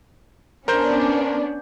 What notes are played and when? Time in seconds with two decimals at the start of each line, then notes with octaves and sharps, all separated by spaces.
0.68 B3 C#4 D4 A#4 C5 G6